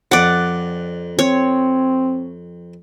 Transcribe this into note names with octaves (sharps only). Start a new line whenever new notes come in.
F2 D5 F#5
C4 C#5